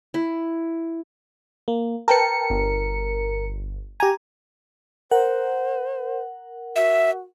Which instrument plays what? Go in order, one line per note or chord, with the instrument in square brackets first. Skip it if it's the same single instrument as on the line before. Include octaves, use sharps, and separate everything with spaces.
[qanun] E4
[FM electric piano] A#3
[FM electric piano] A#4 C#7 [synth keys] B4 G5 A5
[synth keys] G1
[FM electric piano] G4 G#5 [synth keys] A#5
[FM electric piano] A#4 F#5 [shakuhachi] C5
[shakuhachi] F#4 [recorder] E5